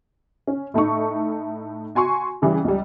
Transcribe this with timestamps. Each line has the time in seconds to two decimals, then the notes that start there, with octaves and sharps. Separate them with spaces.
0.47 C#4
0.74 A2 A3 D#4 C#6
1.95 F#4 G#5 C6 C#6
2.42 C#3 E3 G3
2.65 C#2 G3